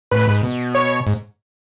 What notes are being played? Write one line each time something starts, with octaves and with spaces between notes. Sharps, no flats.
A2 B4
G#2
B2
C#5
G#2